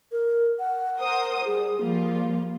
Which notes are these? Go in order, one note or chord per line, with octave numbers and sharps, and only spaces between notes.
A#4
F#5
A#4 C5 D#6
G3 G#4
F3 G3 A#3 F4